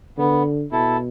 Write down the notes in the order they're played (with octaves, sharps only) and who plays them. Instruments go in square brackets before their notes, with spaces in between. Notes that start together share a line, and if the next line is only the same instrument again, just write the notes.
[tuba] D3 [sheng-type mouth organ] B3
[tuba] B2 [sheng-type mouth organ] E4 A4